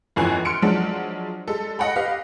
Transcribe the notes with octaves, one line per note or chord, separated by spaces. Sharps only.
G1 F2 E3 G#5 F#6
C6 F6 C#7 D7
F3 F#3 G#3 D4
G3 G#3 A4
D#5 F#5 G5 B5
G4 B4 D#5 F5